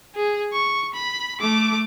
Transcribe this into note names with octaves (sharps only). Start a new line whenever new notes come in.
G#4
C#6
B5
A3 D6